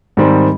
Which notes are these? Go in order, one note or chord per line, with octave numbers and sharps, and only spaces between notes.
G#2 D#3 G3 C4